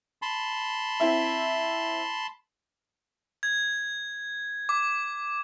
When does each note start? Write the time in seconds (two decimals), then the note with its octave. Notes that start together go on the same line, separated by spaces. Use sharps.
0.22 A5 B5 C6
1.00 C4 E4 E5
3.43 G#6
4.69 D6